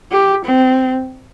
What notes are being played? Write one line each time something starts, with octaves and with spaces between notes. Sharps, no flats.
G4
C4